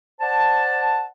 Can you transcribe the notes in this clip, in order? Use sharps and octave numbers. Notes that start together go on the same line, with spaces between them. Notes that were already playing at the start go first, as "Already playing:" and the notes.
C5 D5 F#5 A5